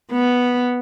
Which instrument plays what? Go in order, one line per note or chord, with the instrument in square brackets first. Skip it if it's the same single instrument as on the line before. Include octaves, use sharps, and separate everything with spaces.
[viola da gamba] B3